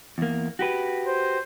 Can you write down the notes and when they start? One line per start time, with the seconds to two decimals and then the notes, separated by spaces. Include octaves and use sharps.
0.18 E2 A#3
0.59 F#4 G4 B4
1.07 C5